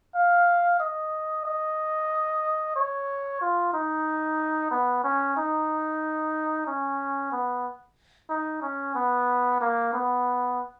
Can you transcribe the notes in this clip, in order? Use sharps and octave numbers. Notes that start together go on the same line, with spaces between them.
F5
D#5
D#5
C#5
F4
D#4
B3
C#4
D#4
C#4
B3
D#4
C#4
B3
A#3
B3